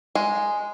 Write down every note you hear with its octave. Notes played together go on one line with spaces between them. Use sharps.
G#3